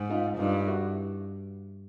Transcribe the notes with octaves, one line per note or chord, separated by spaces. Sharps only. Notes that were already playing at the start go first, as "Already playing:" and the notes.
Already playing: G#2
D#4 F4
G2 D#4 F4
E4 F#4